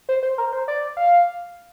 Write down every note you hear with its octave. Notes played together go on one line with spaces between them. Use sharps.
C5
C5
A#4
C5
D5
F5